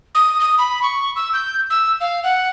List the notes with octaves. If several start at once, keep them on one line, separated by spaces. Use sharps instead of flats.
D#6
D#6
B5
C#6
E6
G6
E6
F5
F#5